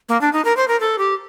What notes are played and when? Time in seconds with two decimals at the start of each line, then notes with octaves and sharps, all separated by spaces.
0.09 A#3
0.21 D4
0.33 D#4
0.45 A#4
0.57 C5
0.68 A#4
0.80 A4
0.98 G4